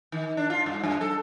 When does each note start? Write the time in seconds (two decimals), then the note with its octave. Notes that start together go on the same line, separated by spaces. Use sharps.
0.12 D#3
0.37 D4
0.50 F4
0.66 G2
0.84 F#2
1.01 A4